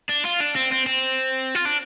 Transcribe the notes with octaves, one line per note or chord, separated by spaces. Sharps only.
D4
F4
D4
C4
C4
C4
F4
D4